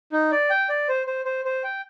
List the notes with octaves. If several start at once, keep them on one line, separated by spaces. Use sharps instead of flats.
D#4
D5
G5
D5
C5
C5
C5
C5
G5